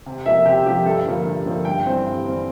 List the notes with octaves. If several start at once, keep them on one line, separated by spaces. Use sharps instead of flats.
C3
F3 A#3 E5
C3 G4
F3 A#3 G4
G2 A4
D3 F3 A#3
G2
D3 F3 A#3
G2 G5
E3 G3 C4
G2
E3 G3 C4